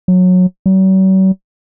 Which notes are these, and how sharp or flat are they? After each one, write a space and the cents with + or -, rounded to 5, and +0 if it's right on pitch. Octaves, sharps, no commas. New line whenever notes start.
F#3 -20
F#3 +45